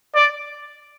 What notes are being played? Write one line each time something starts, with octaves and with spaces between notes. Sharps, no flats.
D5